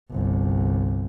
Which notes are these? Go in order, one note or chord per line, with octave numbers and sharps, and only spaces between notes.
G1 C2